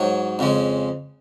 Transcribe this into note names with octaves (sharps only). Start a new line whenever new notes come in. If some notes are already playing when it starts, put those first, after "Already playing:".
Already playing: G#2 F#3 C#5
F2 C#3 G#3